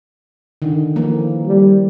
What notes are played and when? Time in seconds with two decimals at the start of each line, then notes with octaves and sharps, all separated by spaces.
0.62 D3 D#3
0.96 E3 F3 A#3
1.46 G3